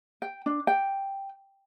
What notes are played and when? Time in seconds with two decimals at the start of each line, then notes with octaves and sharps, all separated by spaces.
0.22 G5
0.46 D4
0.67 G5